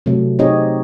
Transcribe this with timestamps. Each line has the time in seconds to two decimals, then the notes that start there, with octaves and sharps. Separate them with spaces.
0.06 C3 F#3 A3
0.39 C4 D#4 G4 G#4 C#5 D#5